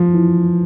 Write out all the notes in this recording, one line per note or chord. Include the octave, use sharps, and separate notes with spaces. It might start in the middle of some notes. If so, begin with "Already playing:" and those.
Already playing: F3
E3